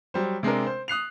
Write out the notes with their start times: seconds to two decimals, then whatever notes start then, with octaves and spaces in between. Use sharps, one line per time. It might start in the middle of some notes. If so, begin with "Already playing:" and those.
0.14 F#3 G3 C5
0.43 C3 G#3 C4 D4 A#4
0.66 C5
0.88 D#6 F#6 C7 F7